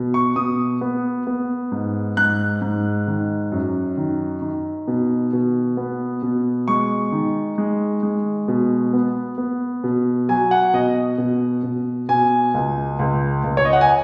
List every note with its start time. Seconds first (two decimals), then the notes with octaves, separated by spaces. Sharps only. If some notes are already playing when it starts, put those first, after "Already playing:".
Already playing: B2
0.14 C#6
0.36 B2 D#6
0.81 B3
1.27 B3
1.72 G#2
2.17 G#2 F#6
2.62 G#2
3.07 D#3
3.52 F#2
3.97 D#3
4.42 D#3
4.88 B2
5.33 B2
5.77 B3
6.22 B2
6.68 G#3 C#6
7.12 D#3
7.58 G#3
8.03 G#3
8.48 B2
8.93 B3
9.38 B3
9.84 B2
10.29 F#3 G#5
10.51 F#5
10.74 B2 D#5
11.18 B2
11.63 B2
12.09 B2 G#5
12.54 C#2
12.99 C#2
13.44 C#2
13.57 C#5
13.65 D#5
13.73 F#5
13.81 G#5